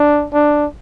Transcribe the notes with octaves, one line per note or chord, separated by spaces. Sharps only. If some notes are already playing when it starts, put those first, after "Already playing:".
Already playing: D4
D4